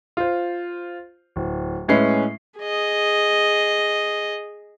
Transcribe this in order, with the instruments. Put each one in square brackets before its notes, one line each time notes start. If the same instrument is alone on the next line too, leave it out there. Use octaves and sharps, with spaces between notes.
[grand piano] F4 C5
D1
A2 G#3 C#4 E4 B4 C7
[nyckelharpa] G#4 D#5